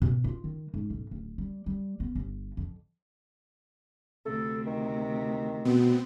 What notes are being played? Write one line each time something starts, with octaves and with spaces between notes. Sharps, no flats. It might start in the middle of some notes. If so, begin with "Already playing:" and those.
B2
F4
D#3
G#2
B1
D1
G3
G3
B3
G1
F2
D2 C3 A4
D#3
B2 B3 C4